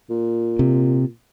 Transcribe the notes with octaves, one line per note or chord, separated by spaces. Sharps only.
A#2
C3